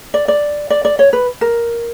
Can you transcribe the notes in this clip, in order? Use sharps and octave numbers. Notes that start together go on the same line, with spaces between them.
D5
D5
D5
D5
C#5
B4
A#4